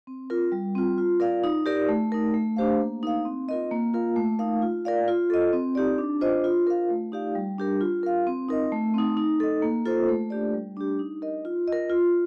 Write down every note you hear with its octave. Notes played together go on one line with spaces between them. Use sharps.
C4
F4 A#4
G3
C4 F4
F4
A#4 D5 F5
D#4
G4 A#4 D5
A3
D#4 A#4
A3
D4 G4 C5 F5
A#3
D#4 A#4 F5
C4
F4 A#4 D#5
A#3
F4 A#4 F5
A3
D#4 A#4 F5
F4
A#4 D5 F5
F4
A4 D#5
C4
D#4 G4 D5
D4
F4 C5 D#5
F4
A#4 F5
A3
D#4 G4 D5 F5
G3
D4 G4 A#4
F4
A#4 F5
C4
D#4 A#4 D#5
A3
C4 D#4
D#4
A4 D#5
A#3
F4 A4 C5
A3
D4 G4 D5
G3
D4 G4
D#4
A#4 D#5
F4
A#4 D#5
F4